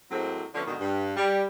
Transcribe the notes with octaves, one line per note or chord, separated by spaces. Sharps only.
A2 F#3 G#3 A#3 C4
D3 F3 A3 B3 C#4 D4
G#2 B2 D3 D#3
G2
G3